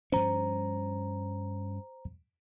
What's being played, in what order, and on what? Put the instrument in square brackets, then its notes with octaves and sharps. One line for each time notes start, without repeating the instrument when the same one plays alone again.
[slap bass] G2 F3 C#4 [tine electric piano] C5 A#5